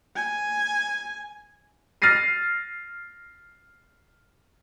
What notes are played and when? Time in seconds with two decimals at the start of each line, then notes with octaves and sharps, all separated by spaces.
0.16 G#5
2.02 F6 A6 A#6 C7 D#7